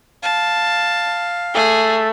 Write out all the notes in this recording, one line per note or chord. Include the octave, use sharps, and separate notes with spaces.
F5 A5
A3 G#4